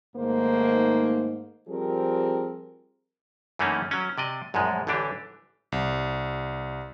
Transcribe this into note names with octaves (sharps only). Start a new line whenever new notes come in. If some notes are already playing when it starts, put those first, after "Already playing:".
G#2 D#3 A3 A#3 C5
F3 G3 C4 G#4 A#4
F#2 E3 A3 A#3 C#4 D#4
F#3 C#4
C3 D5 D#5
A#1 F#2 A2 F3 G#3
A1 D3 E3 D4 G4
C2